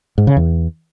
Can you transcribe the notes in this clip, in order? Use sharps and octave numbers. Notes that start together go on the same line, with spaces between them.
G#2
C#3
E2